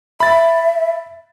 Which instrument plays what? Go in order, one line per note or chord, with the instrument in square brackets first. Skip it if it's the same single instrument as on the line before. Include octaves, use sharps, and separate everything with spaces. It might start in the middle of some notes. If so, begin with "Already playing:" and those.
[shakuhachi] E5 [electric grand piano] B5 A6